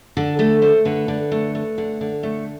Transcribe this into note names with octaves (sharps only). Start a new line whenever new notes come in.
D3 A4
A3 A4
A3 C5
D3 B4
D3
A3
A3
D3
D3
A3